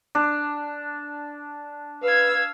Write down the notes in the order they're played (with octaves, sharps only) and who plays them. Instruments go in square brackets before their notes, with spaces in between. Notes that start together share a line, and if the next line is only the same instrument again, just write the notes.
[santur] D4
[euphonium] B4 [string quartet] F5 E6 G#6